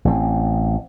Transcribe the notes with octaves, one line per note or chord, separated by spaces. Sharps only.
A1 C4